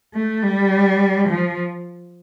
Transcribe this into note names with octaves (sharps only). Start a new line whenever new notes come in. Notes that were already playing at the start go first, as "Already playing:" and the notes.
A3
G3
F3